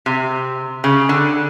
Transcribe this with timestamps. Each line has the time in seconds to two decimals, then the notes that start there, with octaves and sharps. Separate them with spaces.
0.06 C3
0.84 C#3
1.09 D3